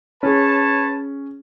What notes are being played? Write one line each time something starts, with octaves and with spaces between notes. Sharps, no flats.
C#4 G#4 B4 C#5 A5